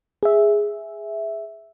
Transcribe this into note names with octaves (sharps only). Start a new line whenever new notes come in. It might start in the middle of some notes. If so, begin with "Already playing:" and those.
G#4 E5